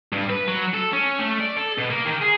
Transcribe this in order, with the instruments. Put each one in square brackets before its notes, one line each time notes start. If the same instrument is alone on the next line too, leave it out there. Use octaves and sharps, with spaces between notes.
[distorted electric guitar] G2
B4
F#3
A4
C#4
A3
D5
A4
B2
A#3
D#3
G#4